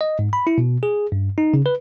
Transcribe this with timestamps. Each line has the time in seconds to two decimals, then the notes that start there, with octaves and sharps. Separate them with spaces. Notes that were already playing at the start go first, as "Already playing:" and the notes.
0.01 D#5
0.19 G#2
0.33 B5
0.47 E4
0.58 B2
0.83 G#4
1.12 G2
1.38 D#4
1.54 C#3
1.66 B4